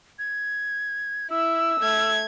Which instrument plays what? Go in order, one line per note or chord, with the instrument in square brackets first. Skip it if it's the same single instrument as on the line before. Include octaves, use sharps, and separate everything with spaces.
[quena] G#6
[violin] E4 [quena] E6
[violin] A3 G#6